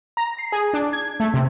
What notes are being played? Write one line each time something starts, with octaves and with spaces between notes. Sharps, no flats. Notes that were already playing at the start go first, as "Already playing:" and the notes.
A#5
C7
G#4
D4
G#6
A3
C3